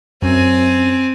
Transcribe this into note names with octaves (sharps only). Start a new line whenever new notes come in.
F#2 C4 G#5